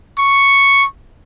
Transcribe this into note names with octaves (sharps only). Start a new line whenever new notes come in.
C#6